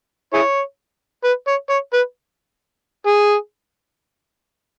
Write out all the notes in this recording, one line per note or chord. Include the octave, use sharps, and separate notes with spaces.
E4 G#4 C#5
B4
C#5
C#5
B4
G#4